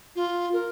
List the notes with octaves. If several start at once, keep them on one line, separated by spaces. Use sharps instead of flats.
F4
A#4